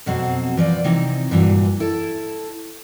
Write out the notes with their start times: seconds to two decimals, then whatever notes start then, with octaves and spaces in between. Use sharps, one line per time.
0.06 F2 B2 F#3 C4
0.57 E3 F3 D5
0.84 C3 E3 C4 D#4
1.31 G2 A#2 E3 F#3
1.80 E4 A4